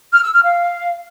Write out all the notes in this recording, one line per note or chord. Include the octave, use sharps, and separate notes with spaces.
F6
E6
F6
F5